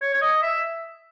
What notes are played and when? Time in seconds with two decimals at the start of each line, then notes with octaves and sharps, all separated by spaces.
0.02 C#5
0.14 C#5
0.21 D#5
0.43 E5